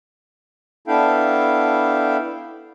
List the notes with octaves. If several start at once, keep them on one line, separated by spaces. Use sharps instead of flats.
B3 D4 E4 A4 F5 G5